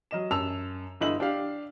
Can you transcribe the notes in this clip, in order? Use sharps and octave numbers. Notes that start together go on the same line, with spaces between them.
F#3 D#5 E7
F#2 A5 E6 F7
G1 D3 E4 D#5 E6 F#7
D4 G4 F5